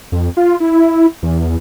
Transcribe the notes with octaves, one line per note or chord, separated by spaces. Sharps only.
F2
F4
E4
E2